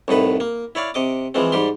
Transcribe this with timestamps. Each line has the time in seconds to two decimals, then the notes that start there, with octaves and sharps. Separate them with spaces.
0.08 C2 A2 D#4 B4
0.40 A#3
0.75 E4 C#5 D5 F5
0.94 C3 D#5 D6
1.34 E3 F3 G#3 C4
1.52 G#2 G3 G4 C6